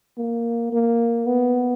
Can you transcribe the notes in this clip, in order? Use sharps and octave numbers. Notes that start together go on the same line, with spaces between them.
A#3
A#3
B3